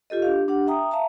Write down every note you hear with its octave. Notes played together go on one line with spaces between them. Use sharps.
F4 G4 A4 D#5
D4 G4 F5
D4 G4 F#5
E5 G5 A#5 D#6
E5 F5 A5 A#5